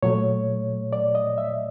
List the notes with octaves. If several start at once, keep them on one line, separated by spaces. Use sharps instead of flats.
A#2 F#3 A3 C#5
D5
D#5
E5